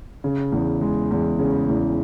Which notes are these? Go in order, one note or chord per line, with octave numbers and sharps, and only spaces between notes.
C#3
E2
G#3
E2
C#3
E2